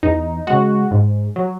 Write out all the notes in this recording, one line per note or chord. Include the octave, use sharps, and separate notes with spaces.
E2 D#4
C#3 G#3 F#4
G#2
F#3